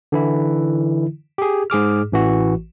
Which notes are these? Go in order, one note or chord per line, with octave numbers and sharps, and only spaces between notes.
D3 E3 E4
G4 G#4
G#2 G#4 D6 F6
A1 E3 F#4